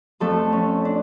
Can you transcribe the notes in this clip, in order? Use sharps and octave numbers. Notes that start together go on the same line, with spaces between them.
F2 F3 A3 A4
C#4
D4